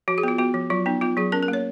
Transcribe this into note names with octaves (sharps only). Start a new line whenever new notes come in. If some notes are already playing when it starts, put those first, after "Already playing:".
F3 F#4
G#4
B3 F4
B3 F#4
F3
F#3 F4
B3 D#4
B3 F4
F#3 G#4
C#4 A#4
A#4
A#3
C#5